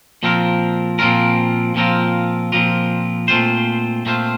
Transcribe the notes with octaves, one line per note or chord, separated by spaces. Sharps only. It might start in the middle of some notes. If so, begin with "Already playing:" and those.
A#2 F3 C4 F4 A#4
A#2 F3 C4 F4 A#4
A#2 F3 C4 F4 A#4
A#2 F3 C4 F4 A#4
A#2 A3 C4 F4 C5
A#2 A3 C4 F4 C5